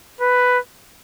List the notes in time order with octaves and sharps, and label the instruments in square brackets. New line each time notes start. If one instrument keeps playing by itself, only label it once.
[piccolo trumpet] B4